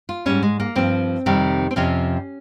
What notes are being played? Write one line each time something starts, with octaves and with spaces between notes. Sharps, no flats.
F4
G#2 G3 C#4
G#3
A#3
G2 F3 C4
F2 C3 D#3 G3
C4
F2 C3 F3 C#4